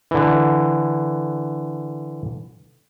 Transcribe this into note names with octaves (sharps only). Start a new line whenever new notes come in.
D3 E3